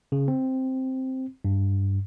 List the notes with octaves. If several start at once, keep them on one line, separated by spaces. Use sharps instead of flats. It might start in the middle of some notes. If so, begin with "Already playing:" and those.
C#3
C4
G2